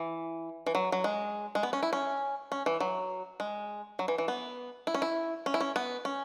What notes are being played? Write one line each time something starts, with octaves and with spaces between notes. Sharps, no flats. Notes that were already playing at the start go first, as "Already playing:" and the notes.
Already playing: E3
E3
F#3
F#3
G#3
G#3
B3
C#4
E4
C#4
C#4
E3
F#3
G#3
F#3
E3
E3
B3
E4
C#4
E4
C#4
E4
C#4
B3
C#4